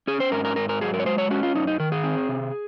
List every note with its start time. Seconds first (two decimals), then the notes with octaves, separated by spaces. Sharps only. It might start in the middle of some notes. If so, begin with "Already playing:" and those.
0.07 C#4 G#4
0.20 C5
0.32 G#2 A#4
0.45 A#4
0.56 G#2 A#4
0.69 A#4
0.81 F#3 G#4
0.94 A#4
0.99 C#5
1.06 G#3 C5
1.18 C#5
1.31 C#4 F#4
1.43 F4
1.55 F#2 D#4
1.67 D#4
1.80 D#3 A#4
1.92 G#4
2.04 C4
2.29 C3